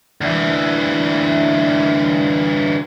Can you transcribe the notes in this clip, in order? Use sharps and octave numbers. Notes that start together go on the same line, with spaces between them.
D2 E3